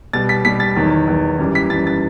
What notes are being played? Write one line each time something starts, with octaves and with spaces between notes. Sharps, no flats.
B2 G3 A6
B6
B2 G3 B6
A6
E2 D#3 F#3
E2 D#3 F#3
F#2 E3 G3
B6
F#2 E3 G3 A6
A6